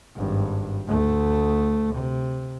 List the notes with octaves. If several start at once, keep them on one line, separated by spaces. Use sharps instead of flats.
G#1 G2
D2 A3
C3